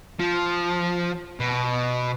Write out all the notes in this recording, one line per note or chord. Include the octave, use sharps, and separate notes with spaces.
F3
B2